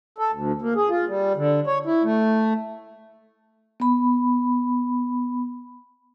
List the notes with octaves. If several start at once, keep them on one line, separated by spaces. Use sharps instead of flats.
A4
D2
A#3
G#4
F4
G3
D3
C#5
E4
A3
B3 B5